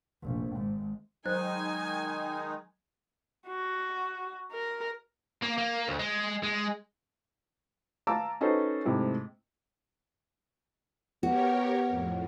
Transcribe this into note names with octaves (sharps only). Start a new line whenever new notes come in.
F1 A#1
G#1 G#2
D#3 F#3 G#3 D#4 C5 G#5 F#6
F#4
A#4
A#3
A#3
D2
G#3
G#3
F5 A5 A#5 D6 E6
C#4 D#4 F#4 A4 B4 C5
G#2 C3 A3 E4
B3 F#4 G4 A#4 C#5
F2 A2